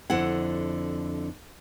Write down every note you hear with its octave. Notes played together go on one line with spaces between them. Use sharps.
F2 D3 E4 F#5